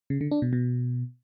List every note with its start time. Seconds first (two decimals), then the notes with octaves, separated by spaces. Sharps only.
0.10 C#3
0.21 D3
0.31 D4
0.42 B2
0.53 B2